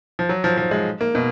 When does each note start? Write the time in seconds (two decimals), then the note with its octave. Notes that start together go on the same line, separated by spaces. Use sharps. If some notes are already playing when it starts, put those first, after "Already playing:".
0.19 F3
0.29 F#3
0.44 F3
0.57 F3
0.71 G#3
1.01 A#3
1.15 B2